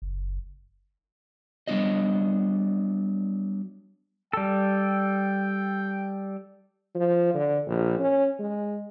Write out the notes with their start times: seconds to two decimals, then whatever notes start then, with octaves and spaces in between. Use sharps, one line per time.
0.02 F#1
1.68 F#3 G3 B3 D4 F#4 D#5
4.33 G3 A4 G5
6.95 F3
7.34 D3
7.67 A#1
7.99 C#4
8.39 G#3